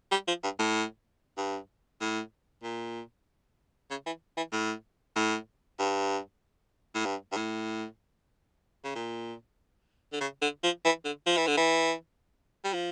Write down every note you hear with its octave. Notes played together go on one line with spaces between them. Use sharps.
G3
F3
G2
A2
G2
A2
A#2
C#3
E3
E3
A2
A2
G2
A2
G2
G2
A2
C#3
A#2
D3
C#3
D3
F3
E3
D3
F3
E3
D3
E3
G3
F3